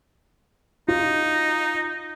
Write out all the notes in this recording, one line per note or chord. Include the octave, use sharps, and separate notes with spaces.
D#4 F4